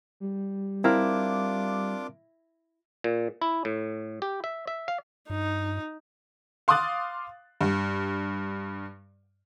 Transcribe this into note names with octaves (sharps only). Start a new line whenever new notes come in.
G3
C4 D4 E4 F4 A#4 F5 D6
A#2
E4
A2
G4
E5
E5
F5
G2 D#4
F5 C6 D6 D#6 F#6 A6
G2